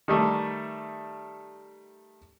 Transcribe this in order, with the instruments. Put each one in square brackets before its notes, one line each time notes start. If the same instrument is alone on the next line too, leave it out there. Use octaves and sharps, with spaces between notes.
[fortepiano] D#3 G3 A3